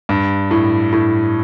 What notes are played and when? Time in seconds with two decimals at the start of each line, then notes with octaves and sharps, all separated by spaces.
0.09 G2
0.51 A2
0.93 A2